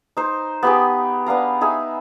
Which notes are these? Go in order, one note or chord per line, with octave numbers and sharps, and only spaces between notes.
D#4 C5
B3 G4 G#4
B3 D4 F5 A#5
D#4 G#4 E5